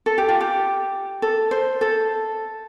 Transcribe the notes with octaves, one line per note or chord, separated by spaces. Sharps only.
A4
G4
F4
G4
A4
C5
A4